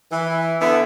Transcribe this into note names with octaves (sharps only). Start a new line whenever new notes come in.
E3
D3 B3 E4